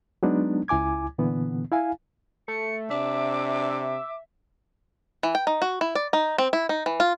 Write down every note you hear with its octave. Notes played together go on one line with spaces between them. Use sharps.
F#3 G#3 B3 D4 D#4
C#2 E4 G#5 D6 G#6
A#2 D3 E3 B3
E4 F5 G#5
A3 C#7
C3 D4 E5 D6
E3
G5
D#4
F#4
E4
D5
D#4
C4
E4
D#4
E3
F4